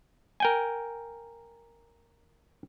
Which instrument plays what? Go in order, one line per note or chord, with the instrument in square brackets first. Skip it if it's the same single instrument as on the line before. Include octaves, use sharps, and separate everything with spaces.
[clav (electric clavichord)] A#4 G5 G#5